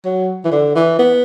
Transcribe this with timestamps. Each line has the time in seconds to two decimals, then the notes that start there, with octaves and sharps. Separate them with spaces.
0.05 F#3
0.45 E3
0.52 D3
0.76 E3
0.99 B3